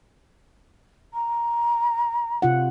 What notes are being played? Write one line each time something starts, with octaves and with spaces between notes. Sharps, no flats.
A#5
C3 F4 F#5